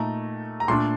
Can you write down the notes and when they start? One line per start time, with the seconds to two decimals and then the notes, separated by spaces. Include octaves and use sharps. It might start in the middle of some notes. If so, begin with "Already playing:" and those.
Already playing: A#2 A3 D#4 A#5
0.60 A#5
0.68 A#2 A3 D4 C6